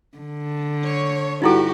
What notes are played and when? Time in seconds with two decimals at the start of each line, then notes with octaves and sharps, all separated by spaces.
0.17 D3
0.84 C#5
1.42 G2 D#4 E4 F#4 G4 A4